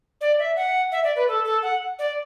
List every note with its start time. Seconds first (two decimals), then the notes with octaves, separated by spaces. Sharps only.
0.21 D5
0.39 E5
0.56 F#5
0.92 E5
1.04 D5
1.16 B4
1.28 A4
1.45 A4
1.63 F#5
1.99 D5